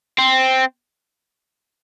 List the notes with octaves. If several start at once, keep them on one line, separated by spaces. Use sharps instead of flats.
C4